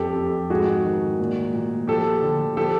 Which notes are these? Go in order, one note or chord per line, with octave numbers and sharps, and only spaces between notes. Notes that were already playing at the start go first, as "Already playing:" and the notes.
Already playing: F2 G4 A4
F2
G#2 F#4 G#4
D#3
A#2
A#2
F3 G4 A4
D3
F3 G4 A4